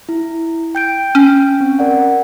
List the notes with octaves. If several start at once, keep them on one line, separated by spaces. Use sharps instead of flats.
E4
G5 G6 D7
C#4
C4
A#4 D5 F#5